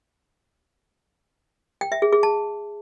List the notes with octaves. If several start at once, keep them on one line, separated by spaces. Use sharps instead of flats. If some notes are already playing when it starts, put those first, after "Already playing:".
G5
E5
G#4
G#4
A5